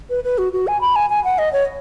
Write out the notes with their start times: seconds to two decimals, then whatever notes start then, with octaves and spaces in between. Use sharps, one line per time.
0.10 B4
0.24 B4
0.38 F#4
0.53 F#4
0.67 G#5
0.81 B5
0.96 G#5
1.10 G#5
1.24 F#5
1.38 D#5
1.53 C#5